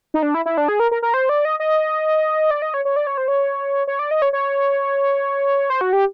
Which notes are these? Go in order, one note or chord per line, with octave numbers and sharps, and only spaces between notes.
D#4
D4
E4
E4
D4
G#4
A#4
A#4
A#4
C5
D5
D#5
D#5
D5
D#5
C#5
C#5
D5
C#5
C5
C#5
C#5
D5
D#5
C#5
C#5
C5
F#4
G4